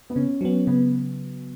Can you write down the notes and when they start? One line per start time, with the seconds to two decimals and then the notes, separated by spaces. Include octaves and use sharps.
0.10 B3
0.16 C#3 C#4
0.41 F#3 B3 C#4
0.67 C#3 B3